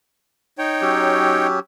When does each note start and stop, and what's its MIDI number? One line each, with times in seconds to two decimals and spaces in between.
0.58 1.47 63
0.58 1.47 73
0.58 1.47 79
0.81 1.59 54
0.81 1.59 61
0.81 1.59 67